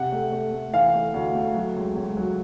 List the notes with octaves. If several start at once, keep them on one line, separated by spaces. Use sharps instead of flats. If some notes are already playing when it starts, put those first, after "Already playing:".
Already playing: C3 F#5
A3
A3
A3
E3 F5
A3
D2
A3
F#3
C#2
C#2
F#3